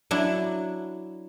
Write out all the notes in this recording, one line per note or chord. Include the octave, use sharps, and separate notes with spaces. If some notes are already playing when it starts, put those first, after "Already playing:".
F#3 D4 E4